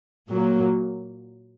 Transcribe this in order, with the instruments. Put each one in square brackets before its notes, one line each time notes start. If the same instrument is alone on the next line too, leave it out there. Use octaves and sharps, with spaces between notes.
[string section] A#2 F#3 A#3